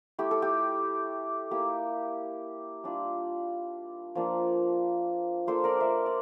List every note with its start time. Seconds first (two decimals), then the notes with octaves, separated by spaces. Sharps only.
0.18 A3 E4 G4
0.31 A4
0.42 G4
1.51 A#3 E4 G4
2.84 G3 D4 F4
4.15 F3 A#3 D4
5.47 A#3 D4 F4 A4 C5
5.64 A#4 D5
5.80 C5 E5
6.06 D5